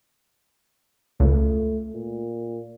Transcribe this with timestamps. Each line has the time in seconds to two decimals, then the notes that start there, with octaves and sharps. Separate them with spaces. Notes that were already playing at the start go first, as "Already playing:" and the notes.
1.20 C#2 A3
1.95 A#2